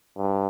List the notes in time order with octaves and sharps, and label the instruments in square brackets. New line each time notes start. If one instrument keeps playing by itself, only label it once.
[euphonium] G2